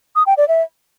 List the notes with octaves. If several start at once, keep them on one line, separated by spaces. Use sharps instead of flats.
D#6
G5
D5
E5